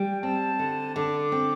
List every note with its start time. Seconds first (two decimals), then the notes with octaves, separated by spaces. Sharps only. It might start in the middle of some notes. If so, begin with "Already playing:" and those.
Already playing: G3 G5
0.22 C4 A5
0.59 D3
0.96 D3 D6
1.32 C4